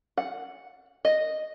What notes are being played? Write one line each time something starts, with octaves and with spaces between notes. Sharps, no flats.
F#5
D#5